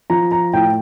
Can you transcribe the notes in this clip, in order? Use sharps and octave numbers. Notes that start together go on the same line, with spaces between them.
F3 A#5
A#5
A2 G5